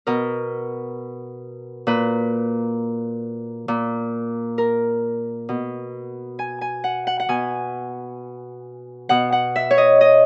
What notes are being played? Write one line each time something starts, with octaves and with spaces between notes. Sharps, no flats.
B2 A#4
A#2 B4
A#2
A#4
B2
G#5
G#5
F#5
F#5
F#5
B2 G#5
B2 F#5
F#5
E5
C#5
D#5
D#5